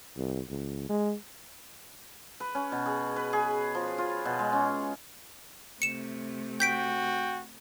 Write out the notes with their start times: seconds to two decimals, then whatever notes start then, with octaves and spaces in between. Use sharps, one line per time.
0.17 C2
0.49 C#2
0.90 G#3
2.40 B4
2.55 C#4
2.72 B2
2.86 G#4
3.16 B4
3.33 G#4
3.75 F3
3.98 F4
4.25 B2
4.39 G#3
4.53 C#4
5.82 C3 A3 C#7 E7
6.60 F#4 G5 G6 B6 D7